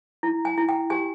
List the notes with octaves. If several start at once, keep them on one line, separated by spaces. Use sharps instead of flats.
E4
G#5
E4
G5
G4 G#5